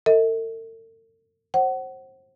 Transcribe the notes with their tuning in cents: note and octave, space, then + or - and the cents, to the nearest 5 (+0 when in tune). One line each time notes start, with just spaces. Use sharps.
A4 +45 D#5 +45
C5 +30 F#5 +25